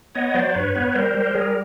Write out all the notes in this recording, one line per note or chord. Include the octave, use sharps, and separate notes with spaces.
B3 C#5 D#5
F#3 C5 D5
D5
G2 B4 C#5
B3 B4 C#5
G3 A#4 C5
G3 A#4 C5
G3 G#4 A#4